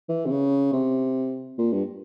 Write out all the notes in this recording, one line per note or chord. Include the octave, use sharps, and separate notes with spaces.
E3
C3
C#3
C3
A#2
G2